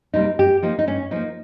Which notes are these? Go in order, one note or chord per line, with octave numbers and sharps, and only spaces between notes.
C3 G3 A#3 D#4
G2 G4
F3 A#3 D#4
D#4
G2 C#4
F3 A#3 D#4